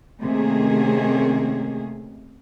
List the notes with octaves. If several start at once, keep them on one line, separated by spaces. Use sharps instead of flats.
C3 D#3 A3 A#3 C#4 G#4